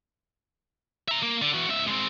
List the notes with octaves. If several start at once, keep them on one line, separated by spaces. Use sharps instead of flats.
E5 A#5
A#3
D3
E3 F#4
C#2 E5
G#3 C4